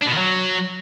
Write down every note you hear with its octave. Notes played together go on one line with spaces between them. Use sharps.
D4
B2
D#3
F#3